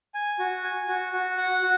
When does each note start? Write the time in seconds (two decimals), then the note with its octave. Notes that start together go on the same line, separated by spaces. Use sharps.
0.14 G#5
0.39 F#4
0.64 G#5
0.88 F#4
1.13 F#4
1.37 F#5
1.62 F#4